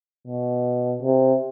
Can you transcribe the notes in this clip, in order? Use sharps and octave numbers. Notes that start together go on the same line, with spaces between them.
B2
C3